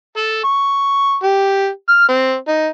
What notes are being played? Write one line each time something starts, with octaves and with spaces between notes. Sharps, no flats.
A4
C#6
G4
F6
C4
D#4